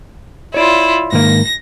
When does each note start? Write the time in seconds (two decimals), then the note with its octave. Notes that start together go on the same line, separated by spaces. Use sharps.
0.54 E4 F4 C#5 D5
1.12 G#2 D#3 A#3 A#6